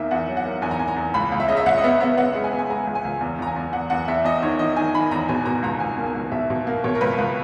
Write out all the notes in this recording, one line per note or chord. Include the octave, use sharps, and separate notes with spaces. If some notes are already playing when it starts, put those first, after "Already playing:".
Already playing: E2 D#3 A#3 E5 G#5
E2 F#5
F#3
F#5
A#3
E2 G#5
A#5
E2 G#5
A#5
E2
C#2 B5
C#2
E5
C#3 D#5
E5
C#2 F#5
D#5
B3 E5
B3 E5
B3 F#5
G#3
G#5
B3
G#5
G#3 A#5
C#2
G#5
C#2
E2
E2 A#5
G#5
E2
E2 F#5
E2 F#5
E2 E5
E2 D#5
D#3 C#5
D#3 D#5
D#3 G#5
D#3 B5
E2 A#5
B2 G#5
B2 A#5
C#2 A#5
C#2 G#5
A#3
G#5
C#2
B2 E5
B2
A#3
B2 C#5
A#4
C#2 B4
C#2